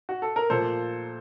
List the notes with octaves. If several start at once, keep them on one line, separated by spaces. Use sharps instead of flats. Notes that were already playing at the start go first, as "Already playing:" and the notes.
F#4
A4
A#4
A#2 F3 A3 A4 C5